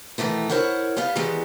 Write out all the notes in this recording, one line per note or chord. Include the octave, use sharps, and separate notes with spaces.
B2 D#3 E3 A3 B3
E4 A#4 C5 C#5 F#5
G3 B3 B4 F5
D#3 E3 G3 G#3 B3